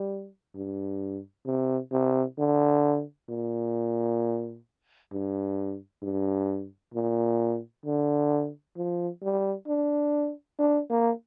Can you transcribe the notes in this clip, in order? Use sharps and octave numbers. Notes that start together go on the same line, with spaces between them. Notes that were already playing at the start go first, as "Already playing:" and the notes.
Already playing: G3
G2
C3
C3
D3
A#2
G2
G2
A#2
D3
F3
G3
D4
D4
A#3